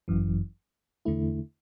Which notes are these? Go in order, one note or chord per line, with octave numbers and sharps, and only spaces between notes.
G1 F#2 E3
E2 D3 A3 E4